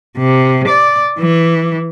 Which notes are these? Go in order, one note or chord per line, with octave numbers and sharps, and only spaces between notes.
C3
D5
E3